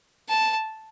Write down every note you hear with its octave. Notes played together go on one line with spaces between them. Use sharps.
A5